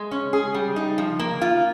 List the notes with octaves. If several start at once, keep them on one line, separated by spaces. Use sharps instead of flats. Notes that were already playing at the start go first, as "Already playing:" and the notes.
Already playing: G#3
C#4
G#4
G3
D#4
F3
A#3
F4